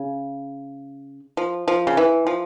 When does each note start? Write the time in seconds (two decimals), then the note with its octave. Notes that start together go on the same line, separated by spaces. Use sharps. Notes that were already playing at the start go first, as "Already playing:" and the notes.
Already playing: C#3
1.37 F3
1.68 F3
1.87 C#3
1.97 E3
2.27 F3